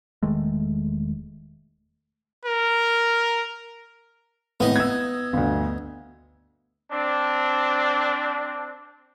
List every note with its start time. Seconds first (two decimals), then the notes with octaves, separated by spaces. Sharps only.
0.23 E1 D#3 G#3 A3
2.46 A#4
4.60 G#1 A2 B3 D#4
4.76 E6 G#6
5.33 G1 D2
6.92 C4 D4